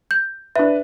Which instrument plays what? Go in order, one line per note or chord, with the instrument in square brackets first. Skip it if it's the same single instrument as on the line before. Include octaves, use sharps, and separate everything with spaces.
[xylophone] G6
[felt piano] D4 B4 [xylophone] E5